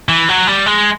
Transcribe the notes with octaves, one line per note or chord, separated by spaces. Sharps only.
E3
F#3
G3
G#3